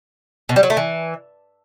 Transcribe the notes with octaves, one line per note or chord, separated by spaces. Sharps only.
B2
G3
F#3
A3
E3